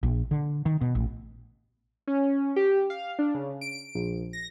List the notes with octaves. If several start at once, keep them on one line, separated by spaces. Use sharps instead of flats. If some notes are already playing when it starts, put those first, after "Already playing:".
A#1
D3
D#3
B2
A1
C#4
G4
F5
D4
C#3
D7
A#1
A#6